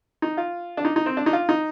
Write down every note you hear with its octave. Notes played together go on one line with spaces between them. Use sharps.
D#4
F4
D4
D#4
D#4
C4
D4
D#4
F4
D#4